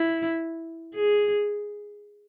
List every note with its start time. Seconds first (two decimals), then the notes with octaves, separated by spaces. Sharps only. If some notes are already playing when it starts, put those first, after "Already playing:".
Already playing: E4
0.95 G#4